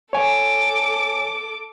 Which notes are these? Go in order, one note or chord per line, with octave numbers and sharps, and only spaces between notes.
A4 C#5 G#5 D6